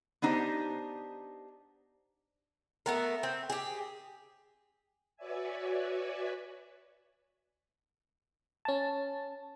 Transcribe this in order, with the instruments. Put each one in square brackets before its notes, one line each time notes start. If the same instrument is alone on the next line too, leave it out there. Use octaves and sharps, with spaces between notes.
[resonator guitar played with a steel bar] B3 D4 D#4 G4 C5
[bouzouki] A3 B3 A#4
C4
G4 G#4
[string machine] F#4 B4 C#5 D5 E5 G#5
[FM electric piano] C#4 A5